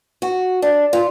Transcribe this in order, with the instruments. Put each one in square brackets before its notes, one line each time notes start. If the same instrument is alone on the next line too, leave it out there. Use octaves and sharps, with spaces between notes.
[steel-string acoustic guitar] F#4
D4
F4